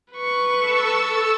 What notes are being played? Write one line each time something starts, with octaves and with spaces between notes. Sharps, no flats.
B4 C#6
A4 A5 E6